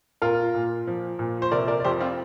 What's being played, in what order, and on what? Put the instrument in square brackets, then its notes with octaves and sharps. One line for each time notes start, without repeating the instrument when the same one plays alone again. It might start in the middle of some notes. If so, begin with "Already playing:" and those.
[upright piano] A#2 F4 A#4
A#2
F3
A#2
C5
C3 A#4 D5
A#4 D5
D5
F2 G4 C5
C4 F4